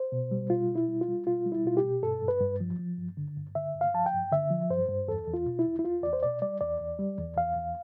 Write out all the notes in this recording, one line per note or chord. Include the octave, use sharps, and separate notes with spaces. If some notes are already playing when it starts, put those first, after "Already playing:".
Already playing: C5
B2
G3
B2 F4
B2
E4
G3
F4
G3
B2 F4
G3
E4
B2 F4
G4
B2
G2 A4
G2
B4
G2
F3
F3
G2
D3
G2
D3 E5
G2
F5
F3 A5
G5
G2
D3 E5
F3
G2 C5
G2
E2 A4
E2
F4
B2
E4
E2
E4
E2 F4
E2 D5
C5
B2 D5
G3 D5
E2 D5
E2
G3
E2
E2 F5
E2